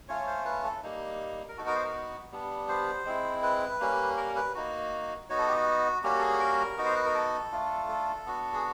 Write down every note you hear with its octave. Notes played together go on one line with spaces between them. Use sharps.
A3 C#4 F4 C#5
C5
B4
A4
G3 A#3 D#4
A#4
B3 D#4 F#4 A4
A#4
C5
A#4
G3 B3 D4
C5
G#3 C4 E4
B4
G3 A#3 C#4
A#4
B4
A#3 D#4 F#4
B3 D#4 F#4 C#5
A4
G4
F#4
G3 A#3 C#4 F#4 G4
A4
G#4
A#4
B3 D#4 F#4
C5
B4
A#4
A4
A3 D4 F4
A4
B3 D4 F#4
G#4